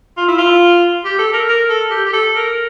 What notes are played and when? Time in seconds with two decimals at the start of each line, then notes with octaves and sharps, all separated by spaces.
0.17 F4
0.28 E4
0.38 F4
1.04 G4
1.19 A4
1.33 A#4
1.48 A#4
1.69 A4
1.91 G4
2.05 G4
2.13 A4
2.35 A#4